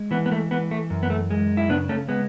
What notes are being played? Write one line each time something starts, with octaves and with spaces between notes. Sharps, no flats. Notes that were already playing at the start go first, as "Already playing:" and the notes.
Already playing: G#3
E3 B3
B3
A3
E3 B3
A3
F#2
B3
A3
G#3
E4
C#3 B3 D4
A3 C#4
G#3 B3